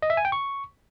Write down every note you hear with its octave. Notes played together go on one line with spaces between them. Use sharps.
D#5
E5
G#5
G5
C#6